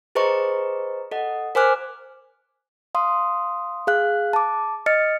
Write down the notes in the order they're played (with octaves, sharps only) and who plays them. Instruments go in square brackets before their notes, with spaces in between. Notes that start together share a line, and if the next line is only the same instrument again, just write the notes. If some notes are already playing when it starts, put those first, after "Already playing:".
[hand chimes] G#4 B4 C5 D#5 A#5 C#6
A4 D#5 F#5
A#4 C5 G#5 D6 F6 F#6
F5 C6 D#6
G#4 F5 F#6
A5 D6
D#5 F6 A6 C#7